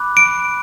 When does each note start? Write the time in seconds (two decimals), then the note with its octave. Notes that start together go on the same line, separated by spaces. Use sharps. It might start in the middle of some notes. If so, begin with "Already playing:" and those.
Already playing: B5 D6 F#6
0.17 D7